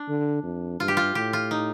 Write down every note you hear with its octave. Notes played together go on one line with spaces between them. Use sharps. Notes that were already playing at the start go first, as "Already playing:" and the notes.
Already playing: D4
D3
F2
G2 F4
G4
F4
A2 G4
F4
D#4